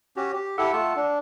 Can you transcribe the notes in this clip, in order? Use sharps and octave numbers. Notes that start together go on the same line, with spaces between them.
C#4 F#4 G4
G4
E4 G4 A4 F#5 D6 E6
A3 F4 A5
D4